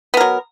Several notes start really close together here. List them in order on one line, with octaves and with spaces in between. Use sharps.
B3 A#4 F#3